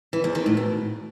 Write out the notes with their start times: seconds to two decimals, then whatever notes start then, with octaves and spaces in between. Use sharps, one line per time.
0.13 E3
0.24 E2
0.35 D#3
0.46 A2
0.57 B2